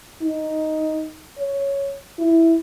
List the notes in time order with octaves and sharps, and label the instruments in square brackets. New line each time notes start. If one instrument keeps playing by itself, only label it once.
[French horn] D#4
C#5
E4